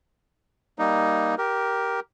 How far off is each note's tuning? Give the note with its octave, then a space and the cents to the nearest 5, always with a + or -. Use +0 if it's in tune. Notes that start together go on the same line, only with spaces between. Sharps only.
G3 +0 A#3 +5 D#4 +0
G4 -10 A#4 +10